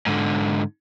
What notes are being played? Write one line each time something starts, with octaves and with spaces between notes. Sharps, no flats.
G#2 D3